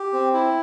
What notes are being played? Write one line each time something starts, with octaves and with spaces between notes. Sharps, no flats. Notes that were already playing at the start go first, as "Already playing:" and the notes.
Already playing: G4
C4
E4